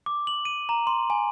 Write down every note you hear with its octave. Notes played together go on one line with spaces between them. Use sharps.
D6
F#7
D#7
A#5
C6
G#5